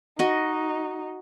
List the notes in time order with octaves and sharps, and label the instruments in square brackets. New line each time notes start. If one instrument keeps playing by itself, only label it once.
[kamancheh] D#4 [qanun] F#4 D#5